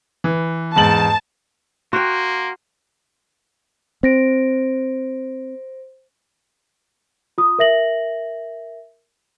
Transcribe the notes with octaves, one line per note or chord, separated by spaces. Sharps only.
E3
E2 G#2 A5 F#7
A#3 F#4 G5 C6
C4 C5 A#6 D7
F4 D#6
A#4 E5 A#6 F#7